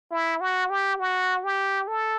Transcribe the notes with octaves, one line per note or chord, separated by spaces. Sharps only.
E4
F#4
G4
F#4
G4
A4